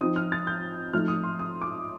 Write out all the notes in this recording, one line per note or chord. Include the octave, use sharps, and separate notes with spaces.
F3 C4 D#4 D#6
F6
A6
G6
F3 A3 D#4 F6
D#6
C6
D#6
D6